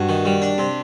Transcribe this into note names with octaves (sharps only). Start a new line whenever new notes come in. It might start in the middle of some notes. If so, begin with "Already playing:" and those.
Already playing: G2 F#4
D#3
G3
D4
C3